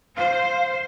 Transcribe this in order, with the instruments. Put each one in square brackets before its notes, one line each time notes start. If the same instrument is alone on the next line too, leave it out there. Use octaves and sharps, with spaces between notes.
[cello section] C5 [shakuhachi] F5